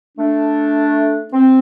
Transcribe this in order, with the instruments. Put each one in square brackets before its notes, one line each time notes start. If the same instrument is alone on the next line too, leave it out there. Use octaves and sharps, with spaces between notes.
[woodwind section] A3 D4
C4